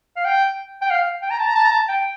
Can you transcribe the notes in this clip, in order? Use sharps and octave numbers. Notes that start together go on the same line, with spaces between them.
F5
G5
G5
F5
G5
A#5
A5
A#5
A5
A#5
A5
G5